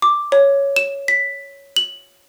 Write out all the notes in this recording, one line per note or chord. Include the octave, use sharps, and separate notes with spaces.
D6
C#5
E7
B6
F#7